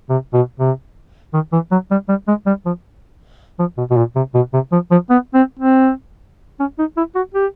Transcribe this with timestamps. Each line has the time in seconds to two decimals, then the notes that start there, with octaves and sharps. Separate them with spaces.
0.09 C3
0.33 B2
0.59 C3
1.34 D#3
1.52 E3
1.71 F#3
1.91 G3
2.09 G3
2.27 G#3
2.46 G3
2.66 F3
3.59 F3
3.77 B2
3.90 B2
3.97 A#2
4.16 C3
4.34 B2
4.53 C3
4.72 F3
4.91 F3
5.09 B3
5.34 C4
5.59 C4
6.59 C#4
6.79 D#4
6.97 E4
7.15 F#4
7.34 G4